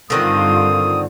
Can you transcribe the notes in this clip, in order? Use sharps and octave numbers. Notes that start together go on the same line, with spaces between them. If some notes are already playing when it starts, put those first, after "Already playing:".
G2 D3 D#3 C4 F4 D#6